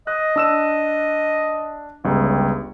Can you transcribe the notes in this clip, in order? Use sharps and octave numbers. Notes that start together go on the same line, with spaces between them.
D#5 F#6
D4 E6 E7
G1 C#2 G3